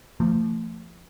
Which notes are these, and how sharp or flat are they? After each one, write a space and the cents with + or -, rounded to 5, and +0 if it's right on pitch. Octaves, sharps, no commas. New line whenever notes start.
F3 -20 A3 +30